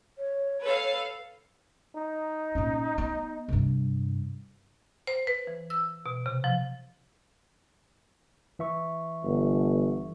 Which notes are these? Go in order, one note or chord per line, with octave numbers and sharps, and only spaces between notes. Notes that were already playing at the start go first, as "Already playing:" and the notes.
C#5
A4 B4 F5
D#4
A#2 C#4
B3
G2 C3
C5
B4
E3
E6
B2
C3
F3
E3 E5 C#6
G1